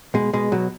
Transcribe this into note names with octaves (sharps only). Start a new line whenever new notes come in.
B2 G#3
B2 G#3
B2 F#3